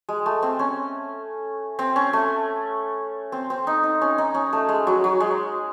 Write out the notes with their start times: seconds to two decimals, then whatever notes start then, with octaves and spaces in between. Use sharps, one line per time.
0.09 G#3
0.26 A3
0.42 C4
0.59 C#4
1.79 C4
1.96 C#4
2.13 A3
3.32 C4
3.50 C4
3.67 D#4
3.83 D#4
4.01 C#4
4.18 D#4
4.34 C#4
4.53 A3
4.69 G#3
4.87 F#3
5.04 F#3
5.20 G#3